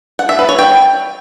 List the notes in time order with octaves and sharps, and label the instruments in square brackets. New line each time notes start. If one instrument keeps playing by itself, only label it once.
[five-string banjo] F#5
E5
B4
C#5
G5